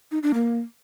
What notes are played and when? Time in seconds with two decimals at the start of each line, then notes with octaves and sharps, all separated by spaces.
0.11 D#4
0.23 D4
0.34 A#3